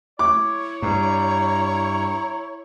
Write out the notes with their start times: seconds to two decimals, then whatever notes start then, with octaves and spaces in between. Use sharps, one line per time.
0.19 E4 C#5 D6
0.82 G2 A#5